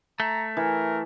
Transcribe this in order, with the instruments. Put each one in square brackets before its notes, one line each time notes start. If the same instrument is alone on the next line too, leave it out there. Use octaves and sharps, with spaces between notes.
[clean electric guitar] A3 [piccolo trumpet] A#5
[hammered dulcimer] E3 [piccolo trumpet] A#4